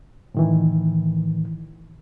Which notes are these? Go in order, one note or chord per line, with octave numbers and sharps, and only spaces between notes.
A2 D#3 E3